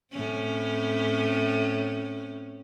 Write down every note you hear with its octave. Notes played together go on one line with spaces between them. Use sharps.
A2 C4 C#4